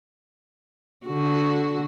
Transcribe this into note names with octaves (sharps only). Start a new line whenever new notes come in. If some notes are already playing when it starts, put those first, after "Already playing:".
D3 F#4